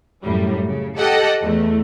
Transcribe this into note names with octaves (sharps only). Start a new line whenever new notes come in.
F#2 A2 G3
C#3
G4 A4 D#5 F#5 G5
E2 A3